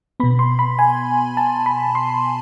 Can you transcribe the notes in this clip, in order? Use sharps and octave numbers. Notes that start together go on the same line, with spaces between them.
B2 B3 B5
C6
B5
G#5
A5
B5
C6